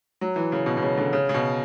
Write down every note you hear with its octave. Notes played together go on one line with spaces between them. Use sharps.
F#3
E3
C#3
B2
B2
C#3
D3
C#3
C#3
B2